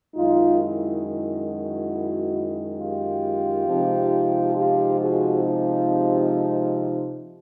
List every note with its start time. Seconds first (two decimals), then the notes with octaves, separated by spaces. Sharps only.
0.15 F#2 D#3 G#3 D#4 F4
0.60 E4
1.04 E4
1.47 E4 F#4
2.79 F4 G4
3.67 C3 F3 G#3 C4 D#4
4.54 F4 G4
4.98 F#4 G#4
5.42 F4 G4